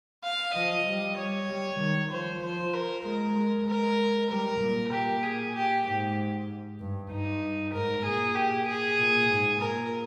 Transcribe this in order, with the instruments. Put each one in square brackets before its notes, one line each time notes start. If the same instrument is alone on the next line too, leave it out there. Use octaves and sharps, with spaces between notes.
[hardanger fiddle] F5
[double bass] F3 [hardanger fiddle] D#5
[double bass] G3
[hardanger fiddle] C#5
[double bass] G3
D#3
[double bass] F3 [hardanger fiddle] C5
[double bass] F3 [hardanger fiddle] C5
[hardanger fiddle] A#4
[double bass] G#3 [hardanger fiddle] A#4
[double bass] G#3
[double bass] G#3 [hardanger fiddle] A#4
[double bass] G3 [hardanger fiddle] A#4
[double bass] A#2
[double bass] A#2 [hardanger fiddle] G4
[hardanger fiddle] G#4
G4
[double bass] G#2 [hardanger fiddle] G4
[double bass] G2
[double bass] G2 [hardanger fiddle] D#4
[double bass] G#2 [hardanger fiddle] A#4
[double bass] A#2 [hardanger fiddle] G#4
[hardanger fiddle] G4
G#4
[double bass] A#2
G#2
[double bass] A#2 [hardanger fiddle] A#4